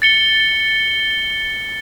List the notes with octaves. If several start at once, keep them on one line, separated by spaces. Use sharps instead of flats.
A6 C#7 G7